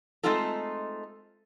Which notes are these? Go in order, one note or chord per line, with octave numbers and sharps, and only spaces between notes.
G#3 A3 C4 D#4 F4 A4